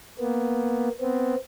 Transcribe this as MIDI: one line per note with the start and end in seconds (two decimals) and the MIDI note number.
0.20 0.89 58
0.20 0.89 59
1.00 1.35 59
1.00 1.35 60